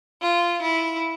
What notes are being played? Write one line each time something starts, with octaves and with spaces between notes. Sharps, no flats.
F4
E4